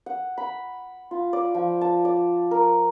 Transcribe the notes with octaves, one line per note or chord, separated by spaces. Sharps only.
F#5
B5
F4
D5
F3
A5
D5
A#4